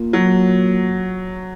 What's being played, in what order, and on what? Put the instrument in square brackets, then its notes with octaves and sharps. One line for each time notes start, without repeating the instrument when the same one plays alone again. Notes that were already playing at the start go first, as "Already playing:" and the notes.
Already playing: [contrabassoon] A#2
[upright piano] F#3